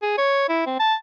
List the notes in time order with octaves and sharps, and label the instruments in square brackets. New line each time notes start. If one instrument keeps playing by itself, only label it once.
[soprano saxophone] G#4
C#5
E4
C4
A5